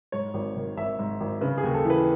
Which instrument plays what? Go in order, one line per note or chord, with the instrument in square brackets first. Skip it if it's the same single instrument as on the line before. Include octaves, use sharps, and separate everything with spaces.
[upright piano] G#2 C#5
G#1
D#3
G#1 E5
G#2
G#1
C#3 B4
G#4
D#2
A4
E3 B4